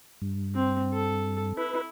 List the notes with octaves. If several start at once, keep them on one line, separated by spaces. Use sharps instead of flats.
G2
C4
A4
E4 B4